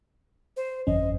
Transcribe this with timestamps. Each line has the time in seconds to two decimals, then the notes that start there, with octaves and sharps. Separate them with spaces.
0.57 C5
0.87 G1 F2 C#4 D#5